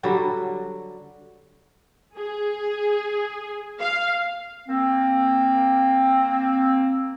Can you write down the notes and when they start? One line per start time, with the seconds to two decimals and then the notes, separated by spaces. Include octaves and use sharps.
0.03 D3 F#3 G3 F#4
2.18 G#4
3.80 F5
4.68 A#3 C4